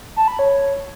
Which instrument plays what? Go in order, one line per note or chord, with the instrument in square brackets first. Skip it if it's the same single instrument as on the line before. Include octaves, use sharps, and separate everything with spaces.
[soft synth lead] A5
B5
C#5